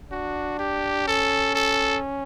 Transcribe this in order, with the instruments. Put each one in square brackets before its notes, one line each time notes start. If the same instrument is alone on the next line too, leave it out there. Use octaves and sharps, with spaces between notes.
[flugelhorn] D4 [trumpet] F#4
[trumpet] G4
[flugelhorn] C#4 [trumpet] A4
[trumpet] A4